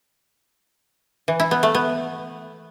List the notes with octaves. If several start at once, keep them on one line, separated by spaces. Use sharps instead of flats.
E3
E4
B3
A3
B3